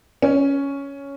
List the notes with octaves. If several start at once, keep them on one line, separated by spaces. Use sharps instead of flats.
C#4